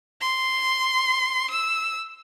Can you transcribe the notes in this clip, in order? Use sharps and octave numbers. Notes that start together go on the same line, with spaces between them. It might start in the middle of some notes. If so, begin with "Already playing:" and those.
C6
E6